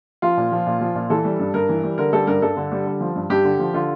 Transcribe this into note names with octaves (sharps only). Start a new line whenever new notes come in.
F3 F4
A#2
F3
A#2
F3
A#2
E3 A4
G3
G2
G2 A#4
E3
G3
D3 A#4
G3 A4
G2 A#4
G2 A4
D3
G3
D3
F3
G2
G2 G4
D3
F3
D3 F4